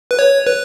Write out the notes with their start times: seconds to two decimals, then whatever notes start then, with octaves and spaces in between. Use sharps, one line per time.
0.11 B4
0.19 C#5
0.47 B4